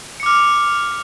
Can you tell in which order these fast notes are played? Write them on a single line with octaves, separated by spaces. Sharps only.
C#7 D6 F6